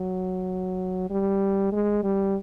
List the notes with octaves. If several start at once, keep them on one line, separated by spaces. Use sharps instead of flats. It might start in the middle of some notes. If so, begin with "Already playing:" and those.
Already playing: F#3
G3
G#3
G3